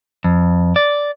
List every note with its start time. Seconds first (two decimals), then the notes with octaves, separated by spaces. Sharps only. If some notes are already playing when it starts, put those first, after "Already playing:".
0.24 F2
0.76 D5